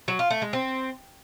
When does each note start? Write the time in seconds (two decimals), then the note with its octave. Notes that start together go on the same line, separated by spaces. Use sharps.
0.08 F#3
0.19 F4
0.30 A3
0.42 G#3
0.53 C4